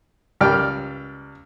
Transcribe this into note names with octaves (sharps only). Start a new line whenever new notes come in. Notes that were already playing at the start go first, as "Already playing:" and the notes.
C#2 G3 D5 G5 F6